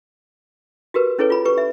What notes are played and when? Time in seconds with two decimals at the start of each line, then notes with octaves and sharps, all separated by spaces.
0.94 F#4 G4 A#4 B4
1.19 C#4 E4 G#4 A4 B4 C#5
1.30 F4 B5
1.45 G4 B4 C#6
1.58 E5